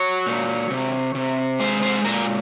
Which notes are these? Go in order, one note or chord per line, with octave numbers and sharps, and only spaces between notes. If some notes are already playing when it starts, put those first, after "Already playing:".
Already playing: F#3 C#5
A#2
C3
C3
G#3 C5
C5
A#2 A#4